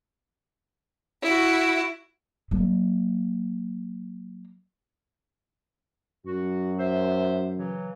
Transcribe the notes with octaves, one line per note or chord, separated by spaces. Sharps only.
E4 F#4
F#3 A#3
F#2 F#4
C5 E5
C#3 E3 F#3